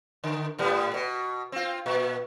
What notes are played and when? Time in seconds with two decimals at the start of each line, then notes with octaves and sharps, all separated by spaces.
0.24 D3
0.58 A2 G3 B3
0.94 B2
1.52 C4 F4
1.86 A#2